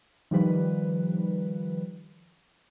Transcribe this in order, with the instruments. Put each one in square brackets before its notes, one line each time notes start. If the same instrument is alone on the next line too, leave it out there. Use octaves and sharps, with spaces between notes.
[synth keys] D#3 F3 G3 B4